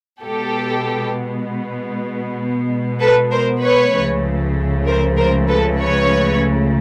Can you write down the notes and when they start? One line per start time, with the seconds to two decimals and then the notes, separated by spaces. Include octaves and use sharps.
0.22 B2 G#3 B3 G4 A4
3.00 A4 B4
3.32 A#4 C5
3.62 B4 C#5
3.94 C#2 C#3 F3 A3
4.86 A#4 C5
5.17 A#4 C5
5.49 A4 B4
5.80 B4 C#5